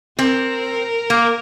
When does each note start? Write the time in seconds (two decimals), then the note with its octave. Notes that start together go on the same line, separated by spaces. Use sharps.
0.19 C4 A#4
1.10 A#3